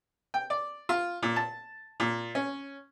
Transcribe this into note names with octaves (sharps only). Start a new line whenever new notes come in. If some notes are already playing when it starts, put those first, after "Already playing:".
G5
D5
F4
A#2
A5
A#2
C#4